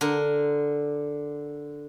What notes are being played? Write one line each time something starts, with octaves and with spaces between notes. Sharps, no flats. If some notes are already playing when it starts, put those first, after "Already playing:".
D3 A#4